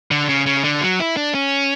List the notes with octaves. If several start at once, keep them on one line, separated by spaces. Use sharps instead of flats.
D3
C#3
C#3
D3
F#3
E4
D4
C#4